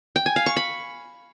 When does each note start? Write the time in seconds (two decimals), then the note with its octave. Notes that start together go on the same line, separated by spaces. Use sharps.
0.16 G5
0.26 G#5
0.36 F5
0.46 C#6
0.56 B5